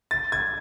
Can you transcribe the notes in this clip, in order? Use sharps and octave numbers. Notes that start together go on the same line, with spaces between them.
A6
G#6